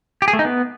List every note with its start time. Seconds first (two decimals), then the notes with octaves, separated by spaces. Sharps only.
0.22 G4
0.28 G#4
0.33 A3
0.39 D#4
0.45 B3